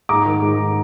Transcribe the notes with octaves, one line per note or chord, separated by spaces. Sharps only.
G#2 A#5 D6
D#3
G#2
D#3